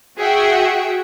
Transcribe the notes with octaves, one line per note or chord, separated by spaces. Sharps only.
F#4 G#4 E5 F#5 G5